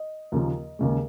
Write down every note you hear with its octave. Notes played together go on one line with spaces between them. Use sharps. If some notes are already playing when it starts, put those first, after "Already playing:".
Already playing: D#5
D#2 C#3 F3 A#3
D#2 C#3 G#3